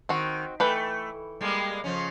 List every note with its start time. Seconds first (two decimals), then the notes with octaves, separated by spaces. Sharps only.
0.09 D#3 C4 F#4
0.60 E3 A3 B4 G5
1.41 G3 G#3 A#3
1.84 C#3 F3 C#4